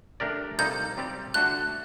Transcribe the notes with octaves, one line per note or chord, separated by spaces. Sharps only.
A3 D4 G4 A#4 D5
C3 G3 A#3 D#4 A4 G6
G3 C4 G4 D5
D3 A3 D4 F#4 F#6